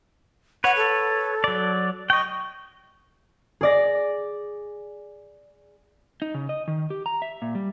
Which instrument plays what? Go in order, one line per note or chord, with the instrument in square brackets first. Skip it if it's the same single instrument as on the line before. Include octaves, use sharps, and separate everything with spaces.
[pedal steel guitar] B4 C#5 [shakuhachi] F#5
[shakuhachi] A4
[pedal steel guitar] F#3 D5
[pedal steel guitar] D#5 G5 [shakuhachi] C#6
[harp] G#4 D5 A#6
[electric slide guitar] D#4
C#3
D#5
D#3
G4
A#5
E5
A#2
G3